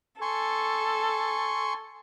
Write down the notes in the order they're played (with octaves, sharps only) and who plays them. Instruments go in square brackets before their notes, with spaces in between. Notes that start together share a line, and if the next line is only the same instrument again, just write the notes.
[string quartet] A4 [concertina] G#5 C6 C#6